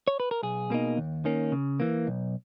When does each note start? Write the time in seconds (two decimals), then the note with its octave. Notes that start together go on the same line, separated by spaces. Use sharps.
0.08 C#5
0.20 B4
0.31 A#4
0.43 B1 G#4
0.70 B2 A#3 D#4
0.97 D#2
1.25 D#3 A#3 C#4
1.52 C#3
1.80 E3 A#3
2.07 B1